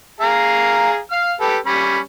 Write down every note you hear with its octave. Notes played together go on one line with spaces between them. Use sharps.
G#4 F5 A#5
F5 F6
G4 A4 B4
G3 C#4 B5